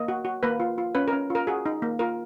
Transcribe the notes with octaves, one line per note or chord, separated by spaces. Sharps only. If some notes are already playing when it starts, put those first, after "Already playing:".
Already playing: A#3 D#5
F#4
F#4
A#3 B4
F4
F4
C#4 B4
A#4
C#4
F4 A#4
F#4 G#4
D#4
A#3
F4 A#4